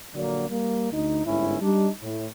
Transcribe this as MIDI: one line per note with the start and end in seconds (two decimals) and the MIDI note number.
0.14 0.46 34
0.14 0.46 50
0.14 0.46 54
0.14 0.46 58
0.14 0.46 66
0.14 0.46 74
0.49 0.90 55
0.49 0.90 58
0.91 1.25 38
0.91 1.25 63
1.25 1.59 31
1.25 1.59 44
1.25 1.59 61
1.25 1.59 64
1.61 1.89 55
1.61 1.89 62
1.61 1.89 63
2.01 2.26 45